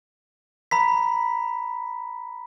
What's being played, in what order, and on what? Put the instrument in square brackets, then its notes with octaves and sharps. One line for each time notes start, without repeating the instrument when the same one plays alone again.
[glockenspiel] A#5 B5 B6